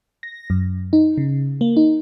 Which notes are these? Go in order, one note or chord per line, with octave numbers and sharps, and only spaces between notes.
A#6
F#2
D#4
C#3
A#3
D#4